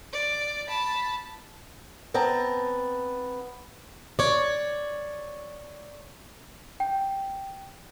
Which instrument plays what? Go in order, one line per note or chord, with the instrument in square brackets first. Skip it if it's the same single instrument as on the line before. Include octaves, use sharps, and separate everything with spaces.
[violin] D5
A5 B5
[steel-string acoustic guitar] B3 C4 A5 A#5
C#5 D5
[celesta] G5